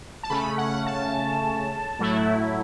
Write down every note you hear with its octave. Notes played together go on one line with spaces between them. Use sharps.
A5
C#3 A3 C#4 B5
F#5
A5
A2 F#3 A3 E4